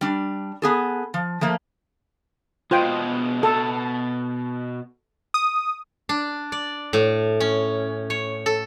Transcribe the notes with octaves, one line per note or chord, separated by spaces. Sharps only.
G3 D4
B3 G#4 A4
F3
F3 A3 A#3
B2 G#3 F4 C5 G5
B2 A4 A5
D#6
D4
D5
A2
C#4
C#5
A4